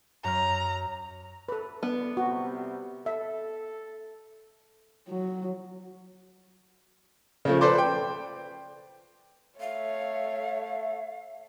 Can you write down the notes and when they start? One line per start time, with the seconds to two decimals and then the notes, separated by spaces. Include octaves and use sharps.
0.24 F#2 A#5 F6
1.49 A4 B4
1.83 D3 B3 D4
2.17 C3 G3 F#4
3.06 A4 E5
5.08 F#3
7.45 C#3 F3 A3
7.61 A4 B4 C5 D5 C6 D6
7.78 G5
9.60 A3 C#5 E5 F5